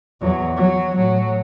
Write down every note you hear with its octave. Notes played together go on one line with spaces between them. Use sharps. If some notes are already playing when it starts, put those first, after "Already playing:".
E2 F#3
F#3
A2 F#3